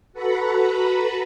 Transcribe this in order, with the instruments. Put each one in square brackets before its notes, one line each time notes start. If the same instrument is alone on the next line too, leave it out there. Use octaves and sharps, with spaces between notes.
[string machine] F#4 A4 B4 F#5 A#5 B5